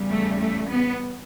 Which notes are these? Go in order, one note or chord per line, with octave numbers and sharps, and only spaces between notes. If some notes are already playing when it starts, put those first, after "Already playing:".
Already playing: E2 C#3 G3
A3
A3
B3